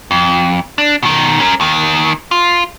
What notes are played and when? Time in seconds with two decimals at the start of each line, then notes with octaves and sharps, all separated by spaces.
0.11 F2
0.78 D4
1.03 B2 D#3
1.40 C#4 A#4
1.60 D#2 D#3
2.31 F4